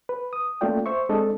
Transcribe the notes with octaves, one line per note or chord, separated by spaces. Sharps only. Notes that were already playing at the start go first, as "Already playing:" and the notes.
B4
D#6
A3 A#3 C#4 F4 D5 G5
C5 E5 C#6
G#3 C4 D4 A4 D5 D#5